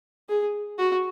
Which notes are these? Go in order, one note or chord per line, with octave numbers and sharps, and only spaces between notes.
G#4
F#4